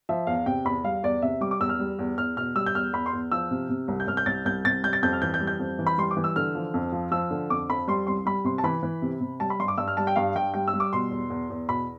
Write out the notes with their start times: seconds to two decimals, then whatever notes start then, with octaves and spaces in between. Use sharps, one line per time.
0.09 F3 E5
0.27 E2 F5
0.46 C3 G5
0.65 E2 B5
0.84 G3 F5
1.03 E2 D5
1.22 C3 E5
1.41 G3 D6
1.51 D6
1.60 E2 E6
1.69 F6
1.79 G3
1.99 E2
2.18 E2 F6
2.37 B2 F6
2.55 G3 E6
2.66 G6
2.75 E2 F6
2.93 E2 B5
3.06 C6
3.13 E2
3.32 F3 E6
3.51 C3
3.69 C3
3.88 C2
4.00 G6
4.07 C2 F6
4.17 G6
4.26 C2 A6
4.45 C2 G6
4.65 C3 A6
4.83 G3 G6
4.93 A6
5.03 F2 G6
5.13 F6
5.22 E3 G6
5.34 G6
5.41 G3
5.47 G6
5.59 F2
5.79 E3
5.87 B5
5.98 G3 C6
6.11 D6
6.17 E3
6.24 E6
6.36 D3 F6
6.55 F3
6.74 F2
6.92 F3
7.11 F3 E6
7.30 D3
7.50 F2 D6
7.69 F2 B5
7.88 G3 C6
8.07 C2 C6
8.26 G3 B5
8.44 C3 C6
8.58 A5
8.64 E3 B5
8.83 E3
9.02 C3
9.21 C3
9.40 G3 A5
9.50 B5
9.60 G2 C6
9.68 D6
9.78 G2 E6
9.88 F6
9.97 G3 A5
10.07 G5
10.16 G2 F5
10.36 G2 G5
10.54 G3 G5
10.68 E6
10.74 G3
10.80 D6
10.93 B2 C6
11.11 E2
11.30 E2
11.50 E2
11.69 B2 B5